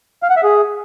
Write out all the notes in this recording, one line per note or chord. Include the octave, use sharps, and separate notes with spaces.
F5
F#5
E5
G#4